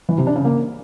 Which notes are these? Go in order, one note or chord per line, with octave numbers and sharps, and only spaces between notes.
E3
C3
D4
C#3
A#3